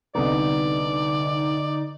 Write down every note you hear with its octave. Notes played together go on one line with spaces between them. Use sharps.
C2 D3 B3 D#4 D5